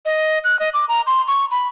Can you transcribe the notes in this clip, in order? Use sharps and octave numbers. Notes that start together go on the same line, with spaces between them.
D#5
F#6
D#5
D6
A#5
C6
C#6
B5